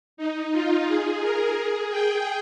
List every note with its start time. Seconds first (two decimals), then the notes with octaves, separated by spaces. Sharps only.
0.17 D#4
0.52 F4
0.86 G#4
1.21 A#4
1.55 G#4
1.90 G5